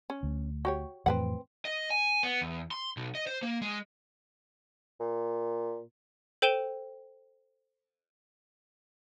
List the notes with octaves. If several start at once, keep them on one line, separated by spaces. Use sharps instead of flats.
C#4
D2
F#4 G4 C#5
F2 A2 E3 C4 B4 F#5
D#5
G#5
B3
E2
C6
B1
D#5
C5
A#3
G#3
A#2
A4 C5 G5 D#7 E7 G7